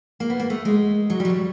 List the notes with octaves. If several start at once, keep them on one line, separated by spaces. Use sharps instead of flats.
A#3
B3
A#3
A3
G#3
F#3
G3
F#3
G3